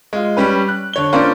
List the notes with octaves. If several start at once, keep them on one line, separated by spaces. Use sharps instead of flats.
G#3 F4
G3 C#4 B4
F#6
D3 C#5 G7
A#3 C#4 D4 F4 C5 D5